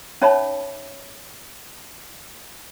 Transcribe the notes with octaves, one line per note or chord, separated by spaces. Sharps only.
C#4 D#4 C#5 E5 A5 B5